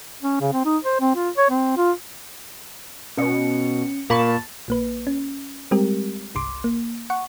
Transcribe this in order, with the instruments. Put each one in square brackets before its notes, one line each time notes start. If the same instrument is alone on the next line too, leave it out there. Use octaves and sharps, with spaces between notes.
[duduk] C#4
C#3
C4
D#4
C5
C4
F4
C#5
C4
F4
[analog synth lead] B2 [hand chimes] C#4 C#7
[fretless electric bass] A#2 [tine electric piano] A#3 B5 C#6 [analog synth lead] A5
[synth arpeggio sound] A#1 A#3 B4
C#4
G3 G#3 C4 G4 A#4
G1 C2 C6 D6
A#3
F#5 C#6